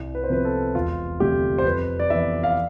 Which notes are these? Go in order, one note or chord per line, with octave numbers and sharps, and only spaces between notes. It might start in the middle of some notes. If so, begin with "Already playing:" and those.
Already playing: C2
B4
C5
C3 F3 B3 B4
A4
E1 F4
D2 C3 G3 G4
C5
F2 B4
D5
E3 B3 E5
F5